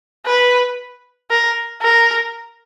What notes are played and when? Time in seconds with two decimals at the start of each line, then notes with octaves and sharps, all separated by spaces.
0.26 B4
1.31 A#4
1.82 A#4